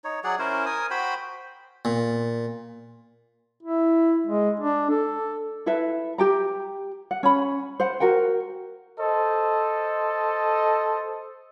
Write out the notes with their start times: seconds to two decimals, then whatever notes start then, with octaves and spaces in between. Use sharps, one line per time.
0.04 D#4 C#5
0.24 F#3 G#4 D5 F#5
0.39 C#4 E4 A#4 C5
0.66 A#4 G#5 D#6
0.91 F#4 C5 G5 B5
1.85 A#2
3.63 E4
4.27 G#3
4.60 D4
4.90 A4
5.66 E4 A4 B4 E5
6.18 G4 G5 A#5
7.11 F#5
7.23 C#4 B5
7.80 C5 F#5
8.00 F#4 A#4 F#5 G5
9.00 A4 C5 D#5